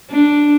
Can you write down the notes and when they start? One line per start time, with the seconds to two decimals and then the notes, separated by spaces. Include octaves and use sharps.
0.11 D4